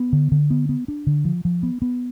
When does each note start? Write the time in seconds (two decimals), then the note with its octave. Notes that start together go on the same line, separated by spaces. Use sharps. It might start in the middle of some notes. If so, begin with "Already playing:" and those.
Already playing: B3
0.13 D3
0.32 D3
0.50 B3
0.69 B3
0.88 D4
1.07 D3
1.25 F3
1.45 F3
1.63 B3
1.82 B3